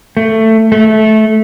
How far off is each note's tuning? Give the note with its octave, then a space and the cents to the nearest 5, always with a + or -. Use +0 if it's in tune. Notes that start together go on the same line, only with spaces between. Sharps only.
A3 +15
A3 -15